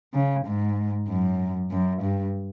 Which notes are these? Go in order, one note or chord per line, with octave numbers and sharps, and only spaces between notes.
C#3
G#2
F#2
F#2
G2